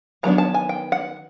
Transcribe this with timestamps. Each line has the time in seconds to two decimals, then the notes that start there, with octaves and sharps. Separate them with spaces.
0.23 D#3 F#3 B3 D4 A#5
0.38 A5
0.54 G#5
0.69 G5
0.92 F#5